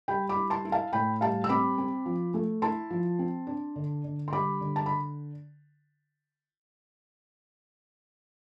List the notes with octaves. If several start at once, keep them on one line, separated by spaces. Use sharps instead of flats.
G3 G5 B5
B5 D6
E4
A5 C6
E4
F5 A5
A2 G5 B5
G3 F5 A5
E6
C4 B5 D6
C4
F3
A3
E4 A5 C6
F3
C4
D4
D3
D3
C6
G3 B5 D6
D3
A5
B5